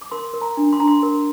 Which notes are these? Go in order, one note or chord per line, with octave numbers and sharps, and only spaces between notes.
D6
A#4 C6
A#4
A#5
D4
C6
D4 A#5
C6
A#4